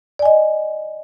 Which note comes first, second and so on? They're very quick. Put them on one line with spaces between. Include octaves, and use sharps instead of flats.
D5 G#5 D#5